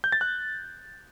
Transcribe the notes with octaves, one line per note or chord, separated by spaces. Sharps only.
G6
A6
F#6